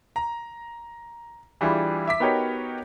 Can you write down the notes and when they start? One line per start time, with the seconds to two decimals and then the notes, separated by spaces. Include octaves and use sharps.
0.16 A#5
1.61 E3 G3 D4 E4 F4 G#4
2.07 E5 D6 B6
2.20 B3 D#4 F#4 G4 A#4 C#5